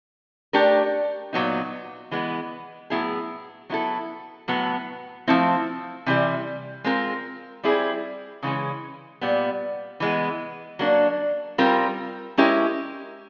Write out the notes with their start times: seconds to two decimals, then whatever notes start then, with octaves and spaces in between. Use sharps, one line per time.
0.53 A3 D4 G4 A#4
1.33 A#2 F#3 B3 D#4
2.11 E3 G#3 B3
2.90 A2 F#3 B3 E4 G#4
3.70 F#3 B3 E4 A4
4.48 A2 F#3 B3
5.28 F3 A3 C4 E4
6.06 C3 E3 G3
6.84 G#3 C4 F4 A#4
7.63 G3 C4 E4 G#4
8.43 C#3 E3 G#3 C#4
9.21 A#2 G3 B3
10.00 E3 G#3 B3
10.79 F#3 A#3 D4
11.58 G3 C4 F4 A#4
12.37 G#3 C#4 E4 G4 A#4